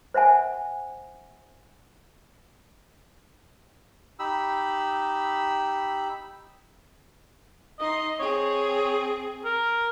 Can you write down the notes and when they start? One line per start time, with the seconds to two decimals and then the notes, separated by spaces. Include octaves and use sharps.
0.14 C5 E5 F#5 G#5
4.19 D#4 G4 B5 E6
7.79 D#4 D#5 C6
8.19 C4 G#4 C#5
9.45 A#4